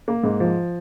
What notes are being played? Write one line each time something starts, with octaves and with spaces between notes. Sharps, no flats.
A#3
G#2
F3